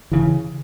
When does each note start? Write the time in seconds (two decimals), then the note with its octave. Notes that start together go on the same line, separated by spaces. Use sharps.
0.12 C#3 E3